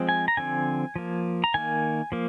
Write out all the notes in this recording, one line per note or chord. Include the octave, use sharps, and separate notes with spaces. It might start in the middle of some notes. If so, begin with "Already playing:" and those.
Already playing: F3 G#3 C4
G#5
A#5
D3 F3 C4 G#5
F3 A#3
A#5
D#3 A#3 G#5
F3 A#3